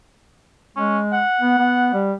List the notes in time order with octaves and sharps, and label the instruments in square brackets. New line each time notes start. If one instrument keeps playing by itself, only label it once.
[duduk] G#3 [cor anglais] C#4
[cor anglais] F#5
[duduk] B3
B3
G3